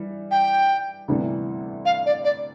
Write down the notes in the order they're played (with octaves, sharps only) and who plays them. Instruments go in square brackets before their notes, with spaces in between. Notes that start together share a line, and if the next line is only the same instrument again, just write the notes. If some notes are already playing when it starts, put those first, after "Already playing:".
Already playing: [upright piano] E3 G3
[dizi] G5
[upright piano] D2 C3 E3 G3 B3
[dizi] F5
D5
D5